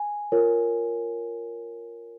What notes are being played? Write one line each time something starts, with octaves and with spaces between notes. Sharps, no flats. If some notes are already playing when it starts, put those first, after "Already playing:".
Already playing: G#5
F4 A#4 C#5